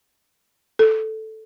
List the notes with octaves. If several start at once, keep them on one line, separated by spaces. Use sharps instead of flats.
A4